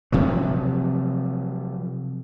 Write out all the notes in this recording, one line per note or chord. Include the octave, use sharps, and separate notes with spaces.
C3 F3 F#3